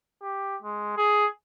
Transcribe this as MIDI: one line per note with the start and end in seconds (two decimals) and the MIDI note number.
0.22 0.56 67
0.62 0.92 56
0.97 1.27 68